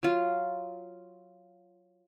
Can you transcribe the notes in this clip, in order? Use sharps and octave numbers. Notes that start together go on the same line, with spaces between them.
F#3 F4